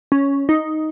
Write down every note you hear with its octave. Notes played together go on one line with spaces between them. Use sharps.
C#4
D#4